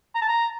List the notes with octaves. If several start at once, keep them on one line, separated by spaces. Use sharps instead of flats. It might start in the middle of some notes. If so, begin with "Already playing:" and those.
A#5
A5
A#5